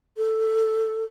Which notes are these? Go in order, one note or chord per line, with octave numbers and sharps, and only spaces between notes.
A4